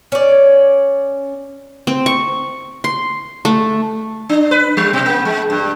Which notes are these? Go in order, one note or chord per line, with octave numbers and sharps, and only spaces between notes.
C#4 D5
C4
C#6
C6
A3
D4
B4
G3
B2
A#3
G#3
G2